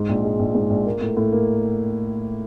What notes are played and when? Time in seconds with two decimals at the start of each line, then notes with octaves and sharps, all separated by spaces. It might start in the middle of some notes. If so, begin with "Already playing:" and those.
Already playing: G#2
0.09 A#1
0.24 G#3
0.39 A#1
0.55 G#2
0.70 A#1
0.86 A#3
1.01 A2
1.17 A2
1.32 A#3